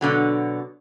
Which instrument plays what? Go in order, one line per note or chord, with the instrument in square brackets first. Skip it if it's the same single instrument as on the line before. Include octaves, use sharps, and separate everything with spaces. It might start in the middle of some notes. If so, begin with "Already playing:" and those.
[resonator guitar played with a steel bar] B2 D3 F#3